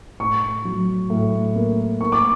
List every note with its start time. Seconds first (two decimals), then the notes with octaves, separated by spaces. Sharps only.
0.20 A2 C#6
0.65 F#3
1.10 A2
1.56 A#3
2.01 A#3 C#6
2.12 D6